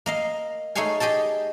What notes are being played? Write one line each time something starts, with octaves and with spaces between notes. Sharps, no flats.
A#3 D#5 F5
A3 D#4 G#4 C#5 F5 G#5
G4 G#4 D#5 G5 A5